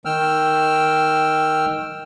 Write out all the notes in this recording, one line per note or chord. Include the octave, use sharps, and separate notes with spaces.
D#3 G5 E6 F6